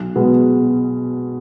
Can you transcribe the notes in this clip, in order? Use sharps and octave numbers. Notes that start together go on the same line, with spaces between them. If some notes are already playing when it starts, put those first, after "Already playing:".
Already playing: B1
B2 G#3 B3